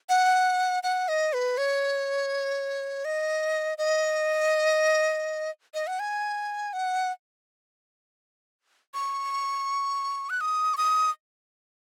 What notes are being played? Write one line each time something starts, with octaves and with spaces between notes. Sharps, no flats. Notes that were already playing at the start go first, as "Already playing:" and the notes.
F#5
F#5
D#5
B4
C#5
D#5
D#5
D#5
F#5
G#5
F#5
C#6
F#6
D#6
C#6
D#6